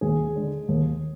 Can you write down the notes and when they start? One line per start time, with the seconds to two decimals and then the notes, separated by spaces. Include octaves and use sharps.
0.01 D#2 G#4
0.36 D3 G#3 D4
0.69 D#2